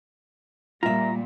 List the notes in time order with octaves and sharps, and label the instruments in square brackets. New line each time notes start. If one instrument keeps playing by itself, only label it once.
[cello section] A#2 G3 [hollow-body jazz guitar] F4 E5 [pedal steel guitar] A#5